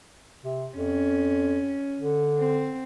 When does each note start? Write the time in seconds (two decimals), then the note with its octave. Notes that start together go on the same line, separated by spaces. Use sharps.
0.44 C3
0.76 F2 C#4
1.99 D3
2.40 C4